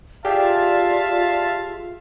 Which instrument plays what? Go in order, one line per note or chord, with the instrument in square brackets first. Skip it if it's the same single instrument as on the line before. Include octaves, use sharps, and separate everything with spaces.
[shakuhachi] F4 [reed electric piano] G4 G#4 [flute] D5 [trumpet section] E5 F5 A5